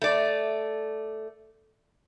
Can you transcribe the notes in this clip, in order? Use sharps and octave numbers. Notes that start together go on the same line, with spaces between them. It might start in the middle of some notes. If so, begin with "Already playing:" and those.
A3 D5